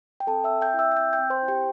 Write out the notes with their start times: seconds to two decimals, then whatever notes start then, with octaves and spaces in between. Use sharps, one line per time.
0.20 G5
0.27 C4 A4 A5
0.44 E5 E6
0.50 C4
0.61 G5 G6
0.74 E4
0.79 E5 E6
0.92 E6
0.96 C4 G5 G6
1.13 G5 G6
1.19 C4
1.30 C5 C6
1.42 E4
1.48 G4 G5